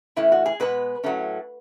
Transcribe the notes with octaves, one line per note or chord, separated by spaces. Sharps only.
A2 E3 A3 C#4 E4
F#4
G#4
B2 G#3 B3 B4
A2 F#3 A3 C#4